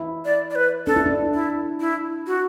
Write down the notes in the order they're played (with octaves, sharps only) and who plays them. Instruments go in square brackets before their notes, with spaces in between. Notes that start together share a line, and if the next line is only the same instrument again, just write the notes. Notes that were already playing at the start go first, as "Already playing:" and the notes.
Already playing: [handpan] E4
[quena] D5
D5
B4
[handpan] D4 [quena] A4
[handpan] E4
D4
[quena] E4
E4
F#4